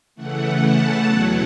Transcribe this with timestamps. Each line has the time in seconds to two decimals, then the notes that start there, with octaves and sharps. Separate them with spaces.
0.15 C#3 E3 A3 F#5
0.61 A5
1.05 E2 B2 F#3 B3 E4 F#5